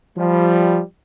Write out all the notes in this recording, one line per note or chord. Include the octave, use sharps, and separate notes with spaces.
F3 G3